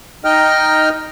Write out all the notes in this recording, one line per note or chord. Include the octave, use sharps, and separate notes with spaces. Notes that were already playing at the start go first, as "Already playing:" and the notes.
D#4 D#5 G5 F6